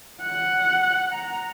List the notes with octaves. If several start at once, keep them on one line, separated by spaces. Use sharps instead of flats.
F#5
A#5